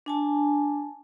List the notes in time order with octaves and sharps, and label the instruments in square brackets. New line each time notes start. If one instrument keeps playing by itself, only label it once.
[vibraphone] D4 G#5 A5